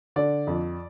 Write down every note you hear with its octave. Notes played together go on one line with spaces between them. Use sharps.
D3 D5
F2